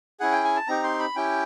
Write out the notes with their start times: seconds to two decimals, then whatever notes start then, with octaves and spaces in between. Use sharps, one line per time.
0.20 C#4 E4 G#4 F#5
0.32 G5
0.44 G#5
0.56 A5
0.68 C4 D#4 G4 A#5
0.84 C6
0.99 B5
1.16 C#4 E4 G4 G5